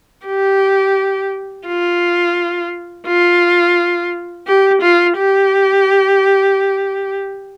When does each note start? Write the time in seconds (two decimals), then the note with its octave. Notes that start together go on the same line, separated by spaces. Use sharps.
0.27 G4
1.67 F4
3.07 F4
4.47 G4
4.82 F4
5.17 G4